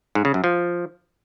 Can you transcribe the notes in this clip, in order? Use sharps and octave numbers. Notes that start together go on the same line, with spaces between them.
G#2
C#3
F#2
F3